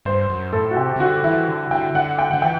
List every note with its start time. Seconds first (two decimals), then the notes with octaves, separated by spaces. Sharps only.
0.05 G2 C5
0.30 F#2
0.53 A2 A4
0.71 F#4
0.77 C3 G4
0.96 C3
1.00 D3 F#4
1.24 E3 E4
1.48 D3
1.71 D3 G5
1.95 D3 F#5
2.19 G5
2.31 D3 F#5
2.42 E3 G5